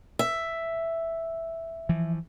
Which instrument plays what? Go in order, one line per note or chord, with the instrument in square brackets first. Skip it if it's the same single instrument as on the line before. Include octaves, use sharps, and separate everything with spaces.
[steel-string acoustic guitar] E5
[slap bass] E3 F3